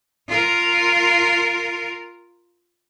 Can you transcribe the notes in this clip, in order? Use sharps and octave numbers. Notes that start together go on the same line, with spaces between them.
F4 A#4